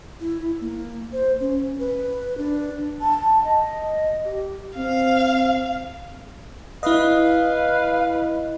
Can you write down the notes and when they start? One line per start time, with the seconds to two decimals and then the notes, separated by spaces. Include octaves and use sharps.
0.20 E4
0.61 A#3
1.13 C5
1.40 C#4
1.79 B4
2.38 D4
3.01 A5
3.44 D#5
4.25 G4
4.77 C4 F5
6.83 E4 B4 D#5 F5